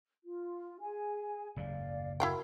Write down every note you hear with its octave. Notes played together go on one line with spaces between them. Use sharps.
F4
G#4 G#5
F#1 D#2 G#2 D5 F5
E4 F#4 A#4 F5 G5